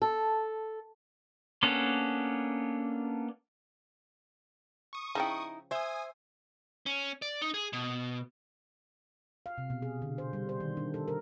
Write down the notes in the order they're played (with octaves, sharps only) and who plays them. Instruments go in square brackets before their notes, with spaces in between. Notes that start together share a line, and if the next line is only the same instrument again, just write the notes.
[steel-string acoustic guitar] A4
[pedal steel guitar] A#3 B3 C#4 D4 A4
[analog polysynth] C#6 D#6
[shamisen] C#3 F3 G5 [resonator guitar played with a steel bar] D#4 E4
[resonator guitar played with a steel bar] C5 E5 [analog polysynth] G#5 D#6
[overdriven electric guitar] C#4
D5
D#4
G#4
B2
[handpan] F5
C3
B2
G#4
D3
C5
G3
C5
D#3
D4
A4
A#4